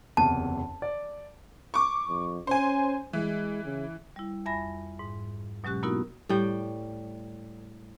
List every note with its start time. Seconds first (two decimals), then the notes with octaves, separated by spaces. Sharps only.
0.17 F#1 E2 C3 A5
0.82 D5
1.74 C#6 D6
2.08 F2
2.47 C#4 C5 G#5
3.13 E3 G#3
3.65 C#3
4.16 G3 E4
4.46 F2 E5 G#5 B5 A#6
4.99 G#2
5.64 B2 F#3 G#3 C#4 G4 F#6
5.83 A#3 B3 D#4 E4 F#4 A#4
6.29 A2 G3 G5